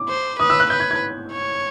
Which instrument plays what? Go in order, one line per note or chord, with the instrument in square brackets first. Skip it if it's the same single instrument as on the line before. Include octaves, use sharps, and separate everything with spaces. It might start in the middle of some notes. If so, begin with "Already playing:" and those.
Already playing: [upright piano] D6
[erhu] C5
[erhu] B4 [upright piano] D#6
[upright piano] E6
F#6
[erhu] B4 [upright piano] G6
[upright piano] G#6
G#6
[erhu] C#5